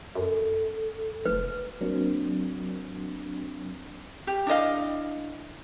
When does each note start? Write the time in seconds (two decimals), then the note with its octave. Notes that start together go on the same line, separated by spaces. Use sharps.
0.15 F#2 A4
1.25 F1 B4
1.81 F#3 A#3 C4 D4
4.27 G4
4.47 D4 E4 D#5 F5